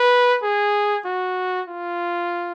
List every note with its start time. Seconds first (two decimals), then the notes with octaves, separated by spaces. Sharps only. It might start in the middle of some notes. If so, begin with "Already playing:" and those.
Already playing: B4
0.43 G#4
1.05 F#4
1.68 F4